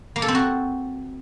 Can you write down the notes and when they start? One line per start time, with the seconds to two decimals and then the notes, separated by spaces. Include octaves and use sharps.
0.16 A#3
0.22 A4
0.28 C4
0.35 F#4